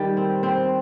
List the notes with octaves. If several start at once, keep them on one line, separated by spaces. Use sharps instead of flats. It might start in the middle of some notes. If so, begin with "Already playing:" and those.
Already playing: D#3 G3
C4
C4